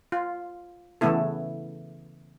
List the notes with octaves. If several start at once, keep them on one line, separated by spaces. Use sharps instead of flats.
F4
C#3 E3 A3 B3 E4 A4